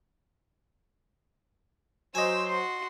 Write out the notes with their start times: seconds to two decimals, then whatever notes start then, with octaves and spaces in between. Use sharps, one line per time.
2.15 F#3 C5 D#5 G#5 E6
2.46 F#4 C6